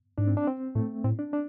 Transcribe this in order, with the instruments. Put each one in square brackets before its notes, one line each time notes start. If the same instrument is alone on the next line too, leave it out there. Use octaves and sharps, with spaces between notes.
[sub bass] G#2 [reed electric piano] D4
[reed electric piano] C4
D4
C4
[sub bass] A2 [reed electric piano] A3
[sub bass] A2 [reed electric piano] C4
[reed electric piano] D4
D4